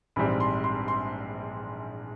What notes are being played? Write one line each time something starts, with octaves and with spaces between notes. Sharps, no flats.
A#1 G#2 E3 G3 C4 B5
C6
C6
C6